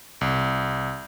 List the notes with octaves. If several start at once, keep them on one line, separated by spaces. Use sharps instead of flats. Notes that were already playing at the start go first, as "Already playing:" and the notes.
C2